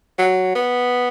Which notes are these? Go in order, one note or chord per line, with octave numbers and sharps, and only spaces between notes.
F#3
B3